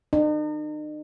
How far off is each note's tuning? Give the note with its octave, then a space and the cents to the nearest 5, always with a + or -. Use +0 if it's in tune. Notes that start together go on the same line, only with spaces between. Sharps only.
D#4 -45